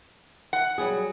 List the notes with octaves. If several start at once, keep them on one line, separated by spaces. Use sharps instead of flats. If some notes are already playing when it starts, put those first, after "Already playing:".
F#5
F#3 G3 G#4